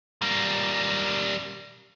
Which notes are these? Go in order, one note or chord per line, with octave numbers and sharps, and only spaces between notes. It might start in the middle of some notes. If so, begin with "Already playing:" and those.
G3 A#3